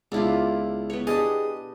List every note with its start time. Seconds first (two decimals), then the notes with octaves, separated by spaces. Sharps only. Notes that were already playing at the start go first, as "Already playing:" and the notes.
0.12 C#2 B3 D4 E4 F4
0.90 B3 C#5
1.07 D4 G4 G#4 D#5 D#6